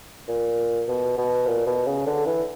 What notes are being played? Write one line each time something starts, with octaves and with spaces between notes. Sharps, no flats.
A#2
B2
B2
A#2
B2
C#3
D3
E3